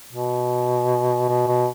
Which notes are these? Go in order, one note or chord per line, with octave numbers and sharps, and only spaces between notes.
B2
B2
B2